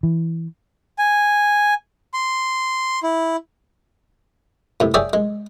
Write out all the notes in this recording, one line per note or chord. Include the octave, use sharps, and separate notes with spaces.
E3
G#5
C6
E4
A2 C3
G#4 C#5 D5 E5 G5 G#5
G#3